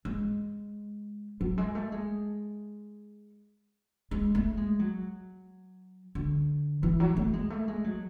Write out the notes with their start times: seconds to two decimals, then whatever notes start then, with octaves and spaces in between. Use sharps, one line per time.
0.05 G#3
1.41 F#3
1.58 G#3
1.75 A3
1.92 G#3
4.11 G#3
4.35 A3
4.57 G#3
4.79 F#3
6.15 D3
6.83 E3
7.00 F#3
7.17 A3
7.33 G#3
7.50 A3
7.68 G#3
7.84 F#3